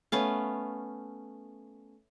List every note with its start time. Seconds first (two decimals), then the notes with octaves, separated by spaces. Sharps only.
0.12 A3 B3 C#4 F5